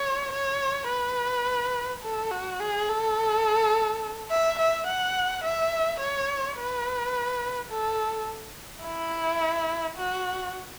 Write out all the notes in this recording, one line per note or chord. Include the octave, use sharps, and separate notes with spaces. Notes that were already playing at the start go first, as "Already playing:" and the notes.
Already playing: C#5
C#5
B4
A4
F#4
G#4
A4
E5
E5
F#5
E5
C#5
B4
A4
E4
F#4